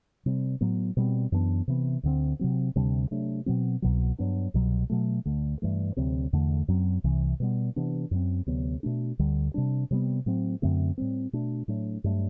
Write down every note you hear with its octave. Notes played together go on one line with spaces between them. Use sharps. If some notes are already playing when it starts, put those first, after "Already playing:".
C3 G3 C4
A2 F#3 B3
B2 G3 C4
F#2 E3 B3 D4
C3 E3 B3
D2 D3 G3 C4
C3 F#3 C4
D2 C3 G3 D4
C3 F#3 A3 D4
B2 F#3 C4
C2 B2 F#3
G2 F#3 B3 D4
C2 B2 F#3
B2 F#3 A3
D2 D3 A3
G2 E3 A3
D2 C3 F#3 C4
E2 D3 A3
F#2 F#3 C4
C2 C3 E3
B2 G3 B3
C3 E3 B3 D4
F#2 F#3 C4
D2 C3 F#3 B3
B2 A3 D4
D2 D3 G3
C3 G3 D4
C3 G3 B3
A2 F#3 C4
F#2 D3 A3 C4
A2 G3 C4
B2 A3 D4
A2 F#3 A3 D4
G2 F#3 A3 D4